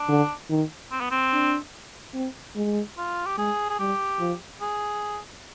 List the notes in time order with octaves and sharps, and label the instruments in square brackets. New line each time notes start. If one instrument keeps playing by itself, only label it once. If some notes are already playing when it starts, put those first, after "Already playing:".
Already playing: [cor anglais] D4
[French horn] D3
D#3
[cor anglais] C4
B3
C4
[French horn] D4
C4
G#3
[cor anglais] F4
G4
[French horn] G#3 [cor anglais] G#4
[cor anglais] G#4
[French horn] G3 [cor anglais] G4
[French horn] F3
[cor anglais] G#4